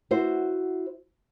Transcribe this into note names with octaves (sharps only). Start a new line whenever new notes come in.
E4 F#4 C5